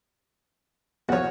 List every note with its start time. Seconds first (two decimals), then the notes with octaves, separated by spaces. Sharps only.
1.09 E2 F3 F#4 C#5